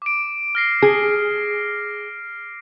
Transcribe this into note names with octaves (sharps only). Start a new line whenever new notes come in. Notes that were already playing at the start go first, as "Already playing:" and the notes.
D6 D7
F6 A#6 C7
G#4